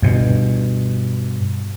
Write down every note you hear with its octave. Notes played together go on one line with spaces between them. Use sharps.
G2 B2